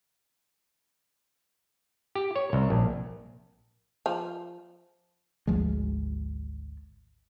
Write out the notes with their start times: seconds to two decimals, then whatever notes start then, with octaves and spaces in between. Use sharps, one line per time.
2.15 G4
2.36 C#5
2.53 C2
2.70 A#1
4.06 F3
5.47 G#1 D2 F3 G#3